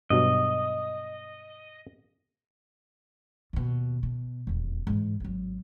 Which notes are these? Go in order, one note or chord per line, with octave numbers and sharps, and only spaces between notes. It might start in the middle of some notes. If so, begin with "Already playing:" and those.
G2 B2 F#3 D#5
D#2 B2
B2
D#1 E2
G#2 E3
G#1 F#3